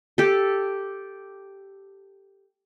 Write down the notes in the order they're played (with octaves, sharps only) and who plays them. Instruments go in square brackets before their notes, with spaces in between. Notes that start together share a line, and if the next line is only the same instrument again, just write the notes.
[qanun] G4 A4